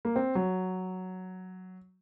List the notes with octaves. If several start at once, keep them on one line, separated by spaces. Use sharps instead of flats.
A#3
C4
F#3